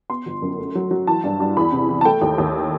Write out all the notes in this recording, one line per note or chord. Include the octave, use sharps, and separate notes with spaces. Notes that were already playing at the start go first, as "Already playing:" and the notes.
B3 C6
G1
F#2
A3
F#3
F#3
E3 A5
G2
G2
E2 B5
C3
E3
A5
A3 G5
D#2
D#2